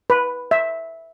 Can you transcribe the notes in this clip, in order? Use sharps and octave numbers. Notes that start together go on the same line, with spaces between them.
B4
E5